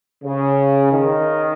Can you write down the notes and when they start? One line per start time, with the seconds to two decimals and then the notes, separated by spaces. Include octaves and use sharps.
0.24 C#3
0.92 D#3